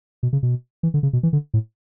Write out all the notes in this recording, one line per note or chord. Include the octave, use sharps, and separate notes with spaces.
B2
C#3
B2
E3
D3
C#3
B2
E3
D3
A2